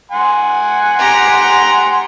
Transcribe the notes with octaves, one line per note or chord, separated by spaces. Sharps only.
F#5 G#5 C6
G4 A#5